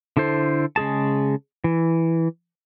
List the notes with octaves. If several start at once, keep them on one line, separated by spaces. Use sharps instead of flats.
D3 E4 A4 C5
C#3 G#3 G#4 A5
E3